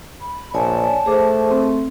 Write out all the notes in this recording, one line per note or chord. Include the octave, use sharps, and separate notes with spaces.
B5
A#1 C#5 D5 G#5 A5
A3 G#4 C5 D6
C4